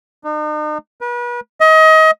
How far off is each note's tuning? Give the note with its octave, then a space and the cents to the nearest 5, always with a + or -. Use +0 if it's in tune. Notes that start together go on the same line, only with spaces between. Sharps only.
D#4 -45
B4 -35
D#5 +30